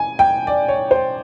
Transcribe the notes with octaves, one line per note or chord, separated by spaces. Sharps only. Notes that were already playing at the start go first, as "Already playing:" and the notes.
Already playing: G#5
G5
D5
C#5
C5